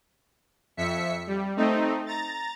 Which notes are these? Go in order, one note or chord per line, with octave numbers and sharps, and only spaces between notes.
F2 E5 B6 C#7
G3
A3 C4 D#4
A#5 A6